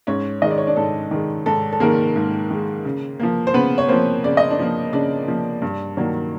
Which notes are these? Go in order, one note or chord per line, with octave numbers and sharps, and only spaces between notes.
G#2 C#4 C#5
D#3 G#3 D#5
D5
C#5
D4 D5
G#2 A4
D#3 G#3
G#2 A4
A4
D#3 G#3 A#3 A#4
G#2
D#3 G#3
C#3
F3 A#3
C5
C#3 B3 B4
C#5
F3 A#3 C4 C5
C#3 D5
D#5
D4 D5
F3 A#3
C#3 D4 D5
F3 A#3
G2
D#3 F#3 A#3 D4